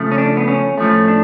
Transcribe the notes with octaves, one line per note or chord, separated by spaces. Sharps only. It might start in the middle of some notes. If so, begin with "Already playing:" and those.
Already playing: C#3 F3 A3
C#4
D4
B3
C#4
A2 F3 A3 C#4
D4